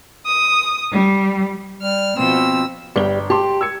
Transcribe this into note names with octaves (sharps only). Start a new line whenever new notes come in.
D#6
G3
G3 F6
B2 F3 C4 E6
G1 G3 G7
G4 A5 C6 D6
E6 G#6 C#7